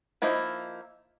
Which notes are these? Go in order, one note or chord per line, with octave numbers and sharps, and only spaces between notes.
F3 A#3 D#4 E4